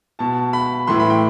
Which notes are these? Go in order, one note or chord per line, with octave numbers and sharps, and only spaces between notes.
B2 A5
B5
A2 E3 C6
B5
G5